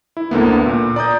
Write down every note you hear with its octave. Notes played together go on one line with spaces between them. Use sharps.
E4
D2 D3 A#3 B3
A#2
D5 A#5 D#6 G6